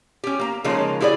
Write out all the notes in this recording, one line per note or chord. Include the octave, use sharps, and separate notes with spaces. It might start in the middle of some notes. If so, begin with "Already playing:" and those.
C#4 G4
A#3 A#5
C#3 F3 G#3 A#3 D#4
E4 G4 G#4 C#5 D5